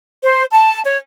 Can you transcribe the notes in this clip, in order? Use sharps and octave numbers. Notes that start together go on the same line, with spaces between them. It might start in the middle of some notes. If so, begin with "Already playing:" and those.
C5
A5
C#5